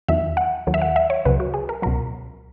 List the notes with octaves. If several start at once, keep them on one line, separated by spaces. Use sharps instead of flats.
E2 D#3 F#3 E5
F#5
D#2 D#3 F#3
E5
F#5
E5
C#5
C#2 C#3 F#3 B4
F#4
G#4
A#4
C#2 B2 F#3 A#4